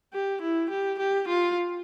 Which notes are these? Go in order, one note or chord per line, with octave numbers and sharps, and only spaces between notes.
G4
E4
G4
G4
F4